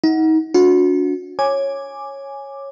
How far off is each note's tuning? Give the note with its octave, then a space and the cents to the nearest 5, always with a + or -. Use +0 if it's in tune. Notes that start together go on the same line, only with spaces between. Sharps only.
D#4 +35 F#5 +0
D4 -40 F#4 -35
C#5 -10 G#5 +0 D6 +5